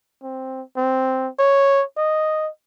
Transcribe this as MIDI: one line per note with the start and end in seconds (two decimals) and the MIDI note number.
0.23 0.62 60
0.77 1.29 60
1.39 1.84 73
1.97 2.49 75